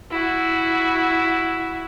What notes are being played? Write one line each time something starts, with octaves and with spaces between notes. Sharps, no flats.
E4 F#4